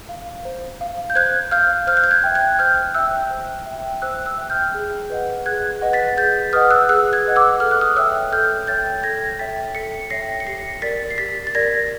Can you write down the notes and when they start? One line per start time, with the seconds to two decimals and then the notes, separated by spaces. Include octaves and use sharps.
0.09 F5
0.45 C5
0.81 F5
1.10 G6
1.15 C5 F#6 G#6
1.51 F5 F6 G6
1.87 C5 F6 G6
1.97 F#6
2.04 G6
2.11 F#6 G#6
2.24 E5 G5
2.35 F#6 G#6
2.59 C5 F6 G6
2.94 E5 G5 E6 F#6
3.31 C5
3.66 E5 G5
4.02 C5 E6 F#6
4.26 E6 F#6
4.38 E5 G5
4.50 F6 G6
4.74 G#4
5.10 B4 D#5 F#5
5.46 G#4 F#6 G#6
5.81 B4 D#5 F#5
5.93 A6 B6
6.17 G#4 G6 A6
6.53 B4 D#5 F#5 D#6 F6
6.70 E6 F#6
6.89 G#4 E6 F#6
7.13 F#6 G#6
7.25 B4 D#5 F#5
7.36 D6 E6
7.60 A4 F6
7.71 F#6
7.81 D#6 F6
7.96 C#5 E5 G5 E6 F#6
8.32 A4 F6 G6
8.67 C#5 E5 G5 G6 A6
9.03 A4 G#6 A#6
9.39 C#5 E5 G5 A6 B6
9.75 A4 B6 C#7
10.10 C#5 E5 G5 A#6 C7
10.40 C#7
10.47 G4 A#6 C7
10.82 A#4 D5 A6 B6
11.10 C7
11.18 G4 A6 B6
11.47 A6
11.55 A#4 D5 G#6 A#6